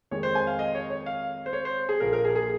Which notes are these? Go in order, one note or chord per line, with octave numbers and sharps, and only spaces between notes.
F2 D#3 G#3 C#5
C5
G#5
F5
D#5
C#5
C#5
F5
C5
C#5
C5
G#4
A#1 A#2 F3 A#3 A#4
A#4
G#4
G#4